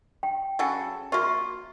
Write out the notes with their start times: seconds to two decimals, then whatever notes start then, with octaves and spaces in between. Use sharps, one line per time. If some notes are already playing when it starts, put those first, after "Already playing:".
0.23 G5
0.59 C#3 F#3 A4
1.12 A#3 F4 F#4 E5 C#6